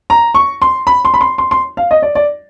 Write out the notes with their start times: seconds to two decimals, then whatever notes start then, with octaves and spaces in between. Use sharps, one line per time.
0.10 A#5
0.35 C#6
0.62 C6
0.87 B5
1.05 C6
1.14 B5
1.21 C6
1.38 C6
1.51 C6
1.77 F5
1.91 D#5
2.02 D5
2.15 D5